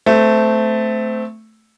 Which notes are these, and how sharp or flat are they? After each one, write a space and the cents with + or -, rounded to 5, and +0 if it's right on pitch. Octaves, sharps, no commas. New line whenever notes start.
A3 +0 C4 -20